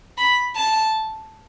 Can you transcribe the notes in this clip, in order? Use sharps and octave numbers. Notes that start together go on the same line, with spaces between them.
B5
A5